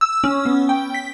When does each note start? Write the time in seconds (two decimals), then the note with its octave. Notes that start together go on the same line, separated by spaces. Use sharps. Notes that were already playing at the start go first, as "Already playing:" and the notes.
0.01 E6
0.24 C#4
0.46 B3
0.69 G5
0.94 B6